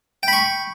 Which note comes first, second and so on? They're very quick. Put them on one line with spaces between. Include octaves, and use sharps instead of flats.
G5 B5 C#6